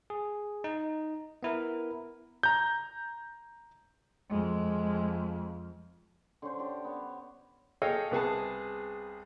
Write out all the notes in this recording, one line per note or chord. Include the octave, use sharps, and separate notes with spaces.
G#4
D#4
B3 E4 A#4
A#5 G6
F2 G#3
D3 C#4 C5
D4 G4
B3 C#5
G#4 A4 C#5 D#5 F5 G5
C2 B3 G#4 A5